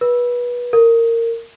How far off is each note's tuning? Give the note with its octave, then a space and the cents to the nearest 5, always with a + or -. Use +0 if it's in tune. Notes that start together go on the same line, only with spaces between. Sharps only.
B4 -25
A#4 -20